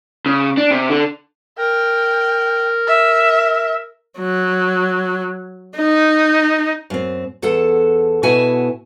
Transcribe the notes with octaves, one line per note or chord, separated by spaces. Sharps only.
C#3
D4
C3
D3
A#4 G5
E5
F#3
D#4
F#2 C4
E2 A4 F#5 A5
B2 E4 F#4 F#5 G#5 A5